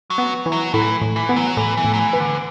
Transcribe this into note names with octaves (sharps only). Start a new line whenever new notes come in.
F#3
B3
E3
F#3
A2 E3
A2
E3
B3
F#3
A2 E3
E3
A2
F#3
E3
B3
D3